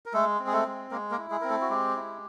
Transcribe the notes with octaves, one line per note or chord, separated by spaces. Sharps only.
A#4
G#3 A3 A4
C4
G#4
A3 A4
G#3
G#3 A#3 A#4
A#3 A#4
E4
G#3 G#4
C4 A#4
A3 A4
F#4
G#3 G4
E4